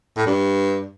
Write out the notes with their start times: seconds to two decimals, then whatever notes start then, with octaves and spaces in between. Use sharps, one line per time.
0.17 A2
0.26 G2